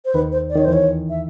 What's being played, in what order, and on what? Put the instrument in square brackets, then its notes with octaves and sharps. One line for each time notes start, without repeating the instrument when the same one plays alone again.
[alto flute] C5
[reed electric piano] D#2 D#3 [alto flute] B4
[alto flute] C5
D5
[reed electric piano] D#3 [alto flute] C#5
[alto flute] C5
[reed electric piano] E2 E3
[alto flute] C#5
E5